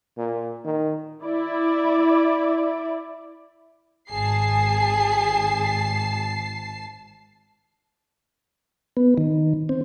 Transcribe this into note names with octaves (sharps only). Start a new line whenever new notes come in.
A#2
D#3
E4 D5
G#1 G#4 A5 C7
B3
D#3
C4